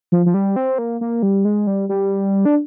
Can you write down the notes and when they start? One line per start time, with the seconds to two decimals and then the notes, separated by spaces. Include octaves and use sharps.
0.12 F3
0.26 F3
0.34 G3
0.56 C4
0.78 A#3
1.01 A#3
1.23 G3
1.45 G#3
1.67 G3
1.89 G3
2.45 D4